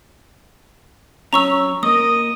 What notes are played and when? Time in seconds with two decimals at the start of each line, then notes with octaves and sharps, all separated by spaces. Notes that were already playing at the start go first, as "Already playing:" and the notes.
1.33 F#3 C#4 C#5 A#5 C#6 E6
1.83 A#3 A#4 D#5 D#6